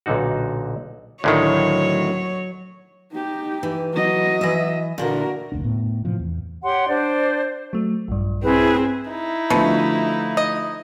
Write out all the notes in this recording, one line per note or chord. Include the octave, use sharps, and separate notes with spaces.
B1 A#2 D3 D#4 F#4
D2 A2 D#3 F#3 C#5
D#4 G4
E3
F#3 D#5
E3 E5
A#2 D3 E4 F#4 A#4
F1 D2 D4
A2 B3
A2 C3 E3 F3
E2
G4 C#5 F#5 C6
D4 C5 D5
F#3 A3
A#1 G2
C4 E4 G#4 B4
D#4 E4
B2 D3 F3 A3
D#5